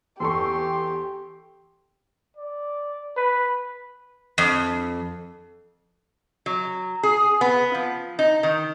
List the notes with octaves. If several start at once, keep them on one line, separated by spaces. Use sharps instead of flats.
E2 G4 A4 C6 C#6
D5
B4
F2
F#3
G#4
B3
F3
D#4
D#3